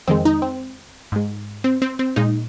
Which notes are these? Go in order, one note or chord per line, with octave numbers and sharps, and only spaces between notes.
F2 D#3 G#3 C4
D#4
C4
G#2 G#3
C4
C4
C4
A#2 G#3 D#4